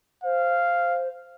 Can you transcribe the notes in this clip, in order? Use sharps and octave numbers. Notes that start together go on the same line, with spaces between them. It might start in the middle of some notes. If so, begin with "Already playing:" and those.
C5 F5